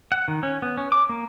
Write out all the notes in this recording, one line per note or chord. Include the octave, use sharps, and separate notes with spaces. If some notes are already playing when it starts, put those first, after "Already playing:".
F#5
D#3
C#4
B3
C#4
D6
A#3